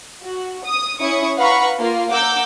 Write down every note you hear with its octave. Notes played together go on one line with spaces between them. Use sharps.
F#4
D#6
C#4 E4 C#6 D#6
B4 F5 F#5 A#5 B5 C#6
A#3 F4
F#5 A#5 D6 E6 G6